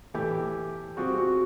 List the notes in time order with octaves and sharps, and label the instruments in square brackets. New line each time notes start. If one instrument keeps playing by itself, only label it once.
[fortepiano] A2 E3 A3 [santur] G4
[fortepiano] G3 C4 F4 G#4 [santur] F#4
[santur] F#4